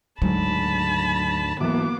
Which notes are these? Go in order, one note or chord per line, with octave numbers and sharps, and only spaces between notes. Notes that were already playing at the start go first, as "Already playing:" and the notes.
D2 G#2 F#3 G#3 A5 B5
G#2 E3 F#3 A#3 B3 D6